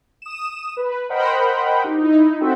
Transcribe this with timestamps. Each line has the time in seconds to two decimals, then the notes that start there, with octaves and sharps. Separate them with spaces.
0.22 D#6 E7
0.77 B4
1.09 A#4 C5 D#5 F#5 G5 B5
1.84 D#4 G4
1.98 D#4 E4
2.41 C4 F#4 A4 E5 G5